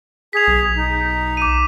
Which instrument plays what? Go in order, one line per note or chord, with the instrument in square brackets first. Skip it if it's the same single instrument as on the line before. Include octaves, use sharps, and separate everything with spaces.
[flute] G#4 [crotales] B6 F7
[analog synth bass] B1
[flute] D#4
[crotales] D6 D#7